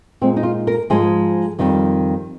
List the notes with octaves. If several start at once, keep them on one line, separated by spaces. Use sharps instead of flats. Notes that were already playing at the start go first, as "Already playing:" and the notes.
A#2 G#3 C4
D#4
F4
A#4
G#2 F3 G#3 G#4
F2 D#3 G3